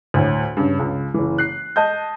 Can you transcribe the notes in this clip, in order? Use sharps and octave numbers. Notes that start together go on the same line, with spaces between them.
D2 A2
G2 C#3
C#2
F#1 E3
F#6 C7
D#5 A5 G6